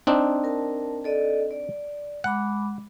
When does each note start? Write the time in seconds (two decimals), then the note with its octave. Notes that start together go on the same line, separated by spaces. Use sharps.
0.07 C4 D4 D#4
0.44 A#4 A5
1.04 A4 D5 D#5
1.51 D5
2.24 G#3 F#5 B5 D6